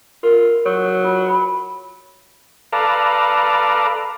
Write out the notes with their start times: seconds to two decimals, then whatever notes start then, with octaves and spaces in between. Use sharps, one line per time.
0.23 F4 A#4
0.65 F#3 C#5 C#6
1.04 F4
1.29 B5
2.73 A4 B4 D5 F5 A#5